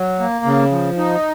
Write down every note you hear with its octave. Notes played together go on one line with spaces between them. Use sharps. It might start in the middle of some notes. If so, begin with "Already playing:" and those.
Already playing: F#3
A#3
C#3
F3
D#4